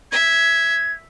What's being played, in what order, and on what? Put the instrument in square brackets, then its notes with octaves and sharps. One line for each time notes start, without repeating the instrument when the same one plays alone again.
[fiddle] E5 [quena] G#6